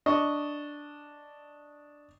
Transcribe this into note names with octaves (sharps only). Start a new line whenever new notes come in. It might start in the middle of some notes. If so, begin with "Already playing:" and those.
D4 D#5 C#6